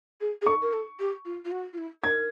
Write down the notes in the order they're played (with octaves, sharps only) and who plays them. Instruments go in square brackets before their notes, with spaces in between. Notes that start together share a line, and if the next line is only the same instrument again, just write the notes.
[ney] G#4
G#4
[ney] A4 [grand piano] C#6
[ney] A#4
A4
G4
F4
F4
F#4
F4
E4
[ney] A#4 [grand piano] G#6